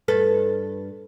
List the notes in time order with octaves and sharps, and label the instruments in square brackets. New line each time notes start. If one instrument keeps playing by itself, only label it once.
[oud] G2 A4 B4